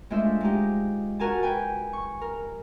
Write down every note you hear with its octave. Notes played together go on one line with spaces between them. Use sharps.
G#3 A3 D4 F4 C5 E5
G#3 D#4 G4
F#4 A#4 G#5 A5
B4 G5 G#5
C#6
A#4